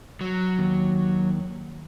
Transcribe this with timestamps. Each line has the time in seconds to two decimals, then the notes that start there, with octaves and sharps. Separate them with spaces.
0.21 F#3
0.59 D#2